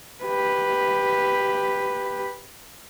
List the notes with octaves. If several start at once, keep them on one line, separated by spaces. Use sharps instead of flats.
G4 B4